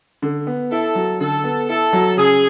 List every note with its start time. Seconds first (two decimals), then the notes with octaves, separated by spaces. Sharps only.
0.22 D3
0.47 B3
0.71 E4 A4
0.95 F#3
1.20 D3 A4
1.44 B3
1.69 E4 A4
1.93 F#3
2.17 C#3 G#4